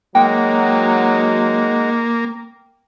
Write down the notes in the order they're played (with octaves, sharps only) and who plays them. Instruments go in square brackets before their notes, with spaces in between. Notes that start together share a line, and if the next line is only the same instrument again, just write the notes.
[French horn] F#3 [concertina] G#3 D#4 F#5 [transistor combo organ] A#3 [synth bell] G5